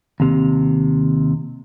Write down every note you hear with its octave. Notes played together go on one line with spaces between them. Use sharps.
D#2 C3